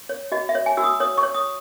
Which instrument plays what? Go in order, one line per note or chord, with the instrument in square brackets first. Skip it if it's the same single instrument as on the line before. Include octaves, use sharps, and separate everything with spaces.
[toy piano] C#5
F#4 D#5
E5
C#5
G#5
F#4 E6
D#6
C#5 D#6
C#6
C#5
D#6